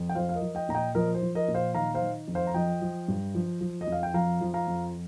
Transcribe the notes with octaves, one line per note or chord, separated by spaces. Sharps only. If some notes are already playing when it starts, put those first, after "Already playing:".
Already playing: F2
G5
F3 C5 F5
F5
A#4 D#5
F3
D#5 G5
A#2 A#5
D#5 G5
F3 A#4 D#5
C5
F3
A#4 D#5
A#2
C5 F5
D#3 F5 A#5
C5 F5
D#3
F2
C5 F5
A#5
F3 D#5 G5
F3
G2
F3
F3
D#5
F2
F5
G5
F3 F5 A#5
F3
F5 A#5
F2